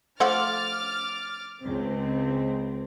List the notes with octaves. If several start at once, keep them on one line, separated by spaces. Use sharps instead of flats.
F3 A3 F#5 D6 F6 A6
C#2 C4